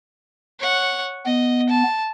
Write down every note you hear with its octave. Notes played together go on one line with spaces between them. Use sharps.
C#5 F#5
B3 D#5
A5